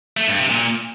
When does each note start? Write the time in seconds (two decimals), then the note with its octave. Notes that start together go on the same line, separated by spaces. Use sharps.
0.17 A3
0.28 G2
0.39 C3
0.50 A#2